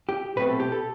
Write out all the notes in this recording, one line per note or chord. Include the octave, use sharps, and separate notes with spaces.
G4
B1 B2 A3 C4 B4
A4
G4
A4